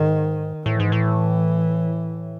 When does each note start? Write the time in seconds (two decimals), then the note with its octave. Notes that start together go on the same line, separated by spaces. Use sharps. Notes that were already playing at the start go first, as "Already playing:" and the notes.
Already playing: G#2 D#3
0.66 A2 E3
0.80 G#2
0.92 A2